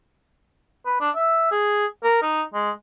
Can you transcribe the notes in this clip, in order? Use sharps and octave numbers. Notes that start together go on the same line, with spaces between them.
B4
D4
E5
G#4
A#4
D#4
G#3